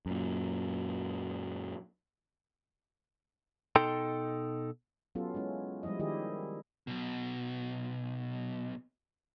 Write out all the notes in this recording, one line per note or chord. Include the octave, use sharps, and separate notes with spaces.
F#2 A#2
B2 D#4 A4 G5 C6
F#3 B3 C#4 F4 G4 A4
G#3 C#4 E4
F3 G3 G#3 E4 D#5
D#3 E4 G4 G#4 D#5
B1 B2